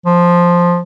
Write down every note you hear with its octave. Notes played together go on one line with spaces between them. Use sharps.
F3